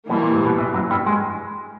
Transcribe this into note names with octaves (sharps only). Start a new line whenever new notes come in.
B1 B2 E3 G3 A#3
A#2
G2
G#2
B1 B2
E2 E3
F#2 F#3
G2 G3
G#3